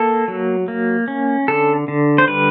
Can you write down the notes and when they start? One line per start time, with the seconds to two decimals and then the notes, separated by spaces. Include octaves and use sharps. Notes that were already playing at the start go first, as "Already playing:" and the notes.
Already playing: A#3 A4
0.28 F#3
0.68 A#3
1.08 C#4
1.48 D3 A4
1.88 D3
2.18 C5
2.28 G3 B4